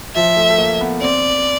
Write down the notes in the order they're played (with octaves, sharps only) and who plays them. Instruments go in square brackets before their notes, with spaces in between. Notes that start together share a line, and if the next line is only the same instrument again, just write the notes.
[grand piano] F3 [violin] E5
[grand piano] A3
A3
A#3
B3
[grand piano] C4 [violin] D5